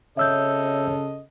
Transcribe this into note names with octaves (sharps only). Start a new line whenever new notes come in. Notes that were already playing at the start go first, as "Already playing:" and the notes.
C#3 A4 C#5 D#5 E5 E6 G6